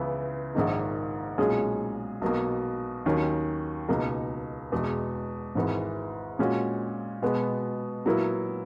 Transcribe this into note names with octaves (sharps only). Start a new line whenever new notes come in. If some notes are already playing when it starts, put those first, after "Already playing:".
Already playing: C#2 C#3 E3 B3 E4
A#1 G#2 D#3 A#3 D#4
B1 A#2 G#3 C#4 G#4
B1 B2 A#3
D#2 D#3 F#3 C#4
C#2 B2 A#3 D#4 A#4
E2 B2 G#3
G#1 G#2 E3
A#2 G#3 C#4 F#4
B2 G#3 B3 F#4
A#2 F#3 B3 E4 A#4